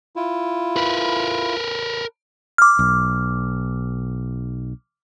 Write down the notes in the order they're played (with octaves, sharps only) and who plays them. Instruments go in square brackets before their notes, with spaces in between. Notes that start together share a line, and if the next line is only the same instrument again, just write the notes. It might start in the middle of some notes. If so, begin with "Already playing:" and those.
[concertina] E4 F4
[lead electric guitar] A#4 B4
[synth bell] D6 F6
[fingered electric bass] B1